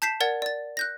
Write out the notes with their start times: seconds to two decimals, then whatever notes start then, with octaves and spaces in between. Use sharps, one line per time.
0.02 A5 G6 B6 C7 E7
0.20 A#4 D5 F#5 G#6 A6
0.42 D5 A6
0.77 F#6 G6 A#6